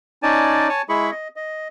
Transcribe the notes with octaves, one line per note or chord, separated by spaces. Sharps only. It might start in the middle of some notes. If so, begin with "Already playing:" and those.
C#4 D#4 D5 G#5 A5
C#5 G#5 A5
G#3 E4 G#4 B5 C#6
D#5
D#5